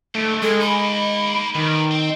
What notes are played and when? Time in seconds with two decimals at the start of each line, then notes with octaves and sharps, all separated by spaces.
0.15 G#2 D3 A3
0.42 G2 G#3 A4
0.61 A#3 D#4 B5
1.55 D#3 B4 D5
1.91 C4